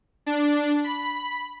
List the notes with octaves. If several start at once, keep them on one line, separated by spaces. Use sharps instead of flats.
D4
B5